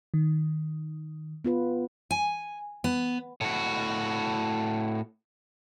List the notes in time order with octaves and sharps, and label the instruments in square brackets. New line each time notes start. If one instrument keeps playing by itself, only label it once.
[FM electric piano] D#3
[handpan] B3 F4 B4
[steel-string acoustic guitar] G#5
B3
[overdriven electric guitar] A2 F#4